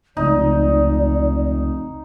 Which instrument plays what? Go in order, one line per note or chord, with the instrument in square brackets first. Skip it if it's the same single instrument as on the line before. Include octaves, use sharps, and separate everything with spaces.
[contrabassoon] F1 [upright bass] C#2 [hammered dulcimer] D#4 [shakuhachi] D5